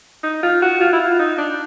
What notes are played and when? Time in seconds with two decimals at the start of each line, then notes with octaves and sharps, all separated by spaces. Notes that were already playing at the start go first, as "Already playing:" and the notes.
0.23 D#4
0.43 F4
0.62 F#4
0.81 F4
0.93 E4
1.00 F4
1.19 D#4
1.38 D4